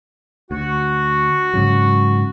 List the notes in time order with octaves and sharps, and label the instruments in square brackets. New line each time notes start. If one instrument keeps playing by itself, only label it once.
[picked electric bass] D2 [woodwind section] F#4
[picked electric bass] G#2 C#3 F#3